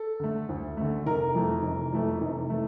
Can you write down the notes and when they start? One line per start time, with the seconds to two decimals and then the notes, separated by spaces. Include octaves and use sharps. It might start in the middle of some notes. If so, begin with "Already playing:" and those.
Already playing: A4
0.20 D3 A3
0.49 D2
0.77 D3 A3
1.06 F1 A#4
1.35 F2 E3 A3
1.63 F1
1.92 F2 E3 A3
2.21 F1
2.50 E3 A3